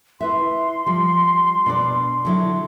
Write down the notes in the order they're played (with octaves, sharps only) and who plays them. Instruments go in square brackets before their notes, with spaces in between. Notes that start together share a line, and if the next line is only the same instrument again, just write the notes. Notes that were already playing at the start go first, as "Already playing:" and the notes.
[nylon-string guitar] E4 B4 E5 [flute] C6
[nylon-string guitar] F3 G3
B2 D4 D5
D3 F#3 E4